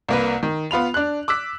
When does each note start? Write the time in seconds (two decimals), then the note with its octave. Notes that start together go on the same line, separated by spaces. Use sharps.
0.08 C2 A#3 B4
0.43 D#3
0.71 B3 F4 B5 F7
0.94 D4 F#6
1.28 D6 E6 F#6 B6